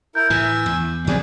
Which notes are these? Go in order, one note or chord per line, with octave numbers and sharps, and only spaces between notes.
E4 A#4 G6
A2 E3 G#5 E6
E2
B2 F#3 C4 D4 G#4